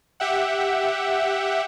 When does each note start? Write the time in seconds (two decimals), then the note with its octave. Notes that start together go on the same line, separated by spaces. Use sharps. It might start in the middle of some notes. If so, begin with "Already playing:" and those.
0.20 G4 E5 F#5